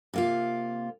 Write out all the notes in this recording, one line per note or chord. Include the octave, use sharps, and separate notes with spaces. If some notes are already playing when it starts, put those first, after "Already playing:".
C3 A#3 F4